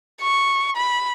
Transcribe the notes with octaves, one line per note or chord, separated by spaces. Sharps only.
C#6
B5